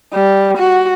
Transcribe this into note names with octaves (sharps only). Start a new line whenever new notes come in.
G3
F#4